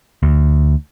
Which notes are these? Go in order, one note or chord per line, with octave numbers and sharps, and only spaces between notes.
D2